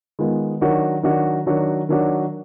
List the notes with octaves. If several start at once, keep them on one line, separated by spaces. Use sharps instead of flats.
D#3 G#3 B3 F4
D#3 F#3 D4 F#4
D#3 F#3 D4 F#4
D#3 F#3 D4 F#4
D#3 F#3 D4 F#4